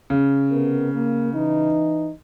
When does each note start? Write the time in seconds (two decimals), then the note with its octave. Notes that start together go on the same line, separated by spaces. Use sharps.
0.10 C#3
0.51 C3 B3 A#4
0.94 A#3
1.34 E3 D#4